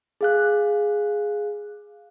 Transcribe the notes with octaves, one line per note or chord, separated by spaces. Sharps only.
G#4 F5 F#6